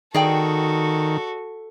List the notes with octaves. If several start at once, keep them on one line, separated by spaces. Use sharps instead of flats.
D#3 F#4 G#4 A4 D5 G5